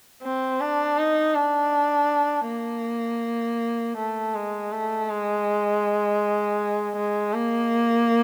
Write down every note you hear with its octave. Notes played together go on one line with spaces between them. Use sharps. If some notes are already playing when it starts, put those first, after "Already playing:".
C4
D4
D#4
D4
A#3
A3
G#3
A3
G#3
G#3
A#3